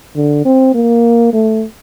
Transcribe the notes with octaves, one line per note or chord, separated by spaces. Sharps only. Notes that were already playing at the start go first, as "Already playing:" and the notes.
D3
C4
A#3
A3